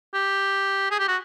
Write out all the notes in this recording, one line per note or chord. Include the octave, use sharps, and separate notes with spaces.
G4
G#4
G4
F#4